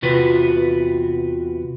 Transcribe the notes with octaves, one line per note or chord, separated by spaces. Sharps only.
E2 C3 F4 F#4 B4